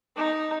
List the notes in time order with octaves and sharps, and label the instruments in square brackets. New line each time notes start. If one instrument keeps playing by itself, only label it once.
[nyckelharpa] D#4